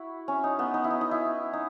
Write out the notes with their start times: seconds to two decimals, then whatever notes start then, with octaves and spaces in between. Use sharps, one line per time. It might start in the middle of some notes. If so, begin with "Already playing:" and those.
Already playing: E4 F#4
0.28 C#4
0.44 D#4
0.59 B3
0.74 D#4
0.84 E4
0.90 D#4
1.01 D#4
1.11 E4
1.53 D#4